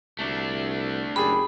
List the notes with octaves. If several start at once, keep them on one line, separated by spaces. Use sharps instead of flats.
C2 A3 D4
F#1 G4 G#4 B5